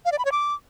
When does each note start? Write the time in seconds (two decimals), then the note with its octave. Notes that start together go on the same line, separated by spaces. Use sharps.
0.05 F5
0.12 D5
0.19 B5
0.25 C#5
0.32 D6